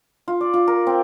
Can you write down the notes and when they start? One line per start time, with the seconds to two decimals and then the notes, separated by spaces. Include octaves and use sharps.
0.28 F4
0.41 D5
0.54 F4
0.68 A#4
0.87 C4